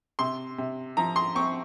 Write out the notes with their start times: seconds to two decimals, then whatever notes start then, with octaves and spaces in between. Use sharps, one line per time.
0.19 C3 C6
0.58 C3
0.97 F3 A#5
1.16 C6
1.35 C4 C#6